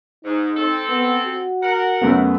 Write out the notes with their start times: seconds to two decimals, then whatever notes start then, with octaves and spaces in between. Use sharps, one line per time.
0.25 G#2 D#4
0.57 C4 A4
0.89 B3
1.26 F#4
1.63 A#4 F#5
2.02 F#2 A3 B3